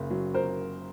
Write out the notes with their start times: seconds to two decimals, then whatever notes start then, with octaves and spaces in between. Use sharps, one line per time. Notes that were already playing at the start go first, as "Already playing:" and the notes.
Already playing: F#1 C#3
0.10 F#3
0.34 A#4 C5